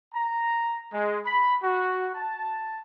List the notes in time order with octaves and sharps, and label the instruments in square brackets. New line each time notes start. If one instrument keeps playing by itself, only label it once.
[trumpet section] A#5
G#3
B5
F#4
A5